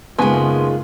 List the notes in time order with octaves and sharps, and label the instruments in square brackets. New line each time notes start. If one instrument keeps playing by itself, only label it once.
[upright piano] F#1 G#5 [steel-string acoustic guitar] D#3 G#3 [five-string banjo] B3 [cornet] F4